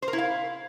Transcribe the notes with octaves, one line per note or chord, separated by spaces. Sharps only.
C5
A#4
E4
F5